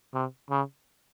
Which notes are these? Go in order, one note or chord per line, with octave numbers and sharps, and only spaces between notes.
C3
C#3